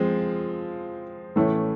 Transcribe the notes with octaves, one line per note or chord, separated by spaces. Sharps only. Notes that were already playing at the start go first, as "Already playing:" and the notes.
Already playing: F3 G#3 C4
A2 E3 A3 C#4 E4